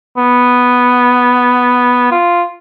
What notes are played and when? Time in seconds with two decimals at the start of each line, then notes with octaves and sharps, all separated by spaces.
0.17 B3
2.12 F4